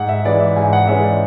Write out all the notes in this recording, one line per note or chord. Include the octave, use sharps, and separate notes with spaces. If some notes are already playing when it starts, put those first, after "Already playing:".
Already playing: G#2 F#5
E5
E3 G#3 C#4 D5
E5
G#2 G#5
F#5
E3 G#3 C#4 E5
D5